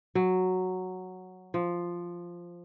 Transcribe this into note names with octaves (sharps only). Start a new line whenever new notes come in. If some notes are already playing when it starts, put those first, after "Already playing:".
F#3
F3